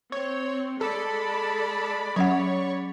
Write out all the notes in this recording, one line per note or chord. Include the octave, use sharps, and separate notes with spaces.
C4 C#5
G#3 A4 D5 B5
F#3 C#4 C#5 F#5